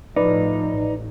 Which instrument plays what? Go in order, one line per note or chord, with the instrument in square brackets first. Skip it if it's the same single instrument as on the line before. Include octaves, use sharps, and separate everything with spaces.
[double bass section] A2 F3 [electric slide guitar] D#4 [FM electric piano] B4 D5
[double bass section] A1